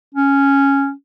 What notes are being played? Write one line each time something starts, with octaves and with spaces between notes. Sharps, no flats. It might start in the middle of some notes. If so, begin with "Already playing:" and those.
C#4